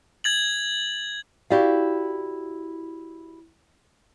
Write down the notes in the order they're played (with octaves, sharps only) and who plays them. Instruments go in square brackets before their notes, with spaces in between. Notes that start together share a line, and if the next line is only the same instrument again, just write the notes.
[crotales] G#6 A6 F#7
[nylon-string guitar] E4 F#4 G4 D5 F5